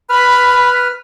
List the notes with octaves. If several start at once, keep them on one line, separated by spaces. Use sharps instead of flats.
B4 B5 F6